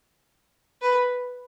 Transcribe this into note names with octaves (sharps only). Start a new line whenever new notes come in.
B4